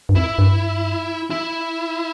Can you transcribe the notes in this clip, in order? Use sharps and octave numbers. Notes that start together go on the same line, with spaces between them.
G2
F2 E4
G2
E4